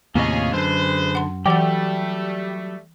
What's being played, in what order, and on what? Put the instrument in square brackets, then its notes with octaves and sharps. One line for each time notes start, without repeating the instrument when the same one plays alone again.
[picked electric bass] D#2 A2 C3 [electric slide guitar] A#3 D#5 [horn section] C#4 F4 G#4
[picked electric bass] F#2 [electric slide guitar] D3 [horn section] G#3 B4 C5
[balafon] F#5 C6
[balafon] E3 F#5 [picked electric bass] F#3 [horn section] G3 A3 [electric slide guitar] G4 D5 G5